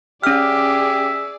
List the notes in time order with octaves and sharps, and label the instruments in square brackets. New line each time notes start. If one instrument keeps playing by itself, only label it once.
[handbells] C#4 F6 [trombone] G4 [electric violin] G#4 D5 [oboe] E5